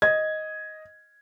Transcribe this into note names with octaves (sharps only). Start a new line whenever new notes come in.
D#5 G#6